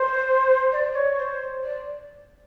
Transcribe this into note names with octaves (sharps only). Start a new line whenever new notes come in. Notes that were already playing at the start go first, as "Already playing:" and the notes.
Already playing: C5
D5
C#5
C5
D5